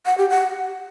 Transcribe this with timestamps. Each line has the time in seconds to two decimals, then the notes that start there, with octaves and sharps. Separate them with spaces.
0.06 F#5
0.18 G4
0.30 F#5